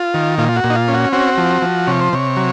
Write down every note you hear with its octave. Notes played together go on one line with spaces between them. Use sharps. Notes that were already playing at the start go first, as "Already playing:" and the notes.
Already playing: F4
D#3
A#2 F4
F4
F#4
A#2
D#4
F4
C#4
F#4
C4 F#4
F3
F3
C3 C#5
C5
C3 C#5
F#3